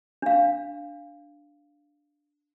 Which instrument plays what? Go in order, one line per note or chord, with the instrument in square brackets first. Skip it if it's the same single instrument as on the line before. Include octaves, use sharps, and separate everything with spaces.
[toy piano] D4 F5